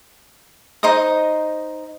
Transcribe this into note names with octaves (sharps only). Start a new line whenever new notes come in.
D#4 C5 D#5 D#6